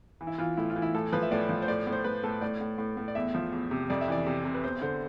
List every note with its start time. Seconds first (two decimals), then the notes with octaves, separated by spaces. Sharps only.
0.21 E3
0.27 E4
0.38 E3 F4
0.57 A2 E4
0.70 F4
0.76 E3
0.82 E4
0.94 A2 A4
1.13 F3 B4
1.22 E5
1.31 A2 D5
1.49 F3
1.62 C5
1.68 A2 D5
1.87 A2
1.92 C5
2.04 A2 B4
2.23 A2 A4
2.41 A2 D5
2.61 A2
2.78 A2
2.97 A2
3.08 D5
3.15 E2 E5
3.35 F3
3.53 E2
3.71 C3
3.90 F2 D5
4.01 E5
4.08 E3 D5
4.26 C3
4.45 C3
4.55 B4
4.63 E2 C5
4.82 D3 C5